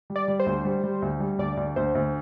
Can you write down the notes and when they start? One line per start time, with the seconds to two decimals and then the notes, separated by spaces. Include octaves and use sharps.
0.10 G3
0.16 D5
0.28 G3
0.40 C5
0.46 D2
0.65 G3
0.83 G3
1.02 D2
1.20 G3
1.39 D2 D5
1.57 D2
1.76 D2 C5
1.95 D2